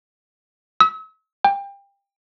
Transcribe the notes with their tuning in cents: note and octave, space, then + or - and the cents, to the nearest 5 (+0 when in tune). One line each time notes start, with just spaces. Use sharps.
E6 -40
G5 +25